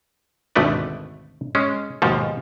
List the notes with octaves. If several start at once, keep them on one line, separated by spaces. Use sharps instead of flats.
G#1 D2 B2 A3 B4 D5
G#3 C#4
D#2 G#2 B2 F3